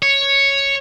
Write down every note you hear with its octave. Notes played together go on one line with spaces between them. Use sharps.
C#5